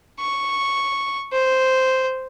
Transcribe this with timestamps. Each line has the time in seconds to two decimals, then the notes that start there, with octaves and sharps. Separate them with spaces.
0.20 C#6
1.33 C5